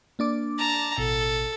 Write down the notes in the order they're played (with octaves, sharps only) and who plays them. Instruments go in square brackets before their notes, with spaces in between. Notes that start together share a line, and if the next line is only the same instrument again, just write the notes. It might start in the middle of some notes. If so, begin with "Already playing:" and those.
[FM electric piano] A#3 D4 D6
[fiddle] A5 A#5
[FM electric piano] A1 B2 [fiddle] A4